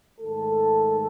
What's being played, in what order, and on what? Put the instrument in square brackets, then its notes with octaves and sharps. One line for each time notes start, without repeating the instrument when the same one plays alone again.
[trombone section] G#2 D#3 A3 A4